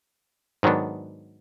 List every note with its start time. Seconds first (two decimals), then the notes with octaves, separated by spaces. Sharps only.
0.63 G#2 D#3 F#3 B3 D4